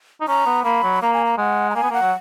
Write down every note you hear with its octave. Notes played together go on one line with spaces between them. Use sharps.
D#4
C#4 A#5
B3
A#3 B5
F#3
A#3 A#5
G#5
A#5
G#3 F#5
A#5
A#3 G#5
B3
A#3 F#5
F#3